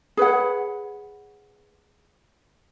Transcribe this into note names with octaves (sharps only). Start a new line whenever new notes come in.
G#4 B4 C#5 F#5